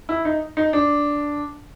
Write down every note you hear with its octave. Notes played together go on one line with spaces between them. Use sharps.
E4
D#4
D#4
D4